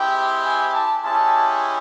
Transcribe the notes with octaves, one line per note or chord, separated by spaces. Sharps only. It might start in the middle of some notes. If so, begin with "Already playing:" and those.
Already playing: G#3 C4 E4 G4 G5
G#5
A5
G#3 C#4 E4 G4 A5